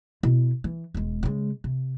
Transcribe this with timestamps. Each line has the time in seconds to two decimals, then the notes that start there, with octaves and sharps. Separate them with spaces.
0.23 B2 E4
0.64 E3
0.94 E1 G#3
1.23 C#3 G#3
1.64 C3